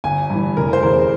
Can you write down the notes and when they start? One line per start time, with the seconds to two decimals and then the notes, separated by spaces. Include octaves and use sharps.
0.04 G1 G#5
0.30 G2 E3
0.57 F1 A#4
0.73 C5
0.83 E2 C#3 E3 A#4